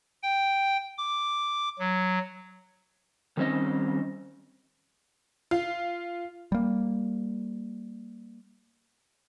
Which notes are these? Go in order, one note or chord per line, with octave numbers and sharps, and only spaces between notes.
G5
D6
F#3
D#3 G3 C4 C#4 D#5
F4
G3 A#3